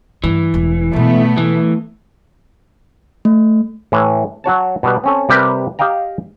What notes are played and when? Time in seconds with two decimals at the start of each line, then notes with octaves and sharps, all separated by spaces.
0.24 G2 E3 A3
0.54 E1 A3
0.93 B2 G#3 A3 B3
1.38 E3
3.25 A3
3.92 A2 E3
4.44 F#3 F#4 C#5 A5
4.83 B2 G3 B4
5.04 C4 C#4 A4
5.29 C3 G3 G4 A#4 B4
5.79 G4 D#5 F5 G5 A#5